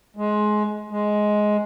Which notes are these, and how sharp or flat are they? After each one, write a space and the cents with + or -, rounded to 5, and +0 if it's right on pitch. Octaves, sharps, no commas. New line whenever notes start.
G#3 +20
G#3 +10